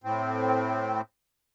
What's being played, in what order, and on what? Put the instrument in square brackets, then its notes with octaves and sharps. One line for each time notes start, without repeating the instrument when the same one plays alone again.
[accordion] A2 C4